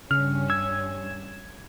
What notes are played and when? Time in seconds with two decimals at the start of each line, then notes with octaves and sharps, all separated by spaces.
0.11 G2 C#3 C#4 F6
0.50 E6 G#6